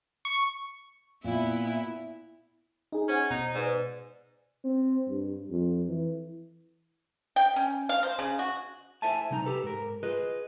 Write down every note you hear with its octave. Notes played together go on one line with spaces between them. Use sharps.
C#6
A#2 B3 E4
D#4 G#4
C#4 C5 F#5
B2 D#4
G#2 B4 D5
C4
G2
F2
E3
G5
C#4
F5
C5
C#3
F#4
E4 A4 C5 E5 G#5 A5
C3 G3 D#4 A#5
G4 A4 B4
G#2 A#4
F4 G#4 B4 D#5